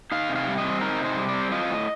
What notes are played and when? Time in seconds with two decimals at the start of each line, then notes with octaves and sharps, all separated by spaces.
0.12 D#4 F5
0.29 C3
0.36 F5
0.47 G3
0.58 D#5
0.65 C4
0.81 D#4 A#4
1.00 C3 C5
1.17 G3
1.28 D5
1.34 C4
1.52 F4 D#5
1.70 A2